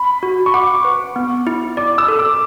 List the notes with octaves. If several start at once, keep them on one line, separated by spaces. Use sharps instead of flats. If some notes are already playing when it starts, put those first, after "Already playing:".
Already playing: B5
F#4
C#6
F#5 D6
B4
B3
E4
D5 D6
E6
A4
D6